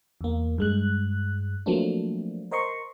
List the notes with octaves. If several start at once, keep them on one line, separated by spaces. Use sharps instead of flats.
E2 A#3
G2 G#3 F#6
F3 F#3 A3 A#3 C4 D4
A#4 C5 D#5 C6 C#6